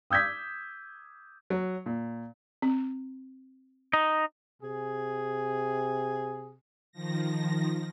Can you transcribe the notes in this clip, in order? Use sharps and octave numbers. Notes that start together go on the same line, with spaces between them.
D#6 E6 G6 G#6 B6
F#3
A#2
C4
D#4
C3 G#4
D#3 F3 A#6